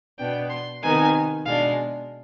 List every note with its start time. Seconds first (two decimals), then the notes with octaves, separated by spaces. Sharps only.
0.19 B2 B3 D4 G5
0.50 C6
0.82 C3 D#3 B3 D#4 G#5
1.45 B2 G#3 D4 F5